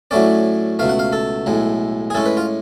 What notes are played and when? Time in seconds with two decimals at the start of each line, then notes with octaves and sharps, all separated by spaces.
0.11 A2 F#3 A3 C#4 D5
0.79 C#2 B2 A3 F5
0.89 F#5
0.99 F5
1.13 A4
1.46 B1 A2 G#3
2.10 G#4
2.15 A2 G#3 C#4 A4
2.26 B4
2.37 F4